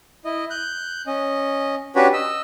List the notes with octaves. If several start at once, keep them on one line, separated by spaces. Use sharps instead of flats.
E4 D#5
F#6 G6
C#4 D#5
C#4 D4 F#4 G4 B4 C#5
D#5 E6